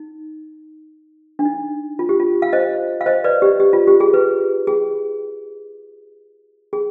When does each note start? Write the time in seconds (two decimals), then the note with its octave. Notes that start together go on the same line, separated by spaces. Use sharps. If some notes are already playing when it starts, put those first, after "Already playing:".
Already playing: D#4
1.39 D4
1.45 D#4
1.99 F4
2.09 G4
2.20 F4
2.42 F5
2.53 C5 D#5
3.01 F5
3.06 C5 D#5
3.24 B4 D5
3.42 G4
3.60 G4
3.73 F4
3.87 G4
4.00 G#4
4.14 B4
4.67 G#4
6.73 G#4